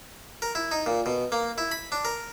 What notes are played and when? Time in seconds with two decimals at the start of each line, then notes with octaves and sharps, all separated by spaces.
0.42 A#4
0.55 E4
0.71 D#4
0.86 A#2
1.06 B2
1.32 A#3
1.58 E4
1.72 B5
1.92 D4
2.05 A#4